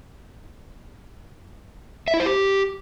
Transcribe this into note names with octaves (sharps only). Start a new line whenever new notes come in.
E5
E4
C5
G4